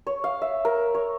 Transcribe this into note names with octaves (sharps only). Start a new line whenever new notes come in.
C#5
F5
E5
A#4
C#5